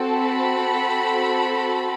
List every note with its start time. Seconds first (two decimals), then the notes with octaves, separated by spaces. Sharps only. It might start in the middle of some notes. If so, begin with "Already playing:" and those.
Already playing: C4 F#4 A4
0.17 B5